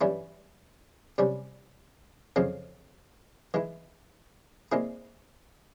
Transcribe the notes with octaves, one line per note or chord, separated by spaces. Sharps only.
G2 E3 G3 C#4 E4
C3 G3 C#4
F2 C#3 F3 G#3 C4
E3 G#3 E4
A#2 G#3 C4 E4 G#4